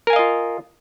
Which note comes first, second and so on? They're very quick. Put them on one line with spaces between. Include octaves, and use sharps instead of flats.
A#4 G#5 F5 D#5 F4